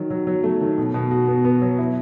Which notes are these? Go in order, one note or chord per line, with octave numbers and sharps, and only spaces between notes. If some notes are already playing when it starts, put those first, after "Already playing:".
Already playing: D#3 F#3
F#3
F#3
A3
D#3
B2
B2
F#4
B3
B3
F#3
E4